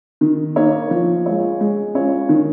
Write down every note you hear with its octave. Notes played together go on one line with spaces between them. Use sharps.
D#3
A#3 D#4 A#4 C#5
F3
G#3 F4 C#5
G#3
C#4 F4 C#5
D#3